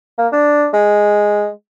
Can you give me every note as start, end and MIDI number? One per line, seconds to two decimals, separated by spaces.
0.18 0.27 58
0.33 0.68 62
0.73 1.49 56